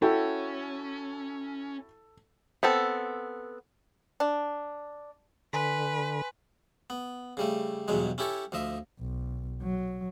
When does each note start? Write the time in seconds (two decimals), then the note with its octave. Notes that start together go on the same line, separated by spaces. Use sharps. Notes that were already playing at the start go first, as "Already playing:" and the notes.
0.02 C#4 E4 F#4 A4 G5
2.63 B3 C4 A4
4.20 D4
5.53 D3 B4 G#5 C6 B6
6.90 B3
7.37 C#3 G3 A3
7.88 E2 G2 B2 F#3 G#3
8.18 C#4 E4 G4 A4 C#5
8.52 D2 F3 D#5 E5
9.00 B1
9.62 F#3